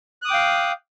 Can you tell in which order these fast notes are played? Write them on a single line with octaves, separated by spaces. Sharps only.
F#6 D#6 D6 G5 F5